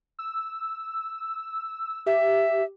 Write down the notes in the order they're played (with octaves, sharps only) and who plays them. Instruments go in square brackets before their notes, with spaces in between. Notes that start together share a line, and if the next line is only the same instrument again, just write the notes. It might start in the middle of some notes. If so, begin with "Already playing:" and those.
[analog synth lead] E6
[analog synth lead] G4 [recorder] E5